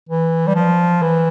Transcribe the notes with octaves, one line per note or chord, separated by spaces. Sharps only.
E3
G3
F3
E3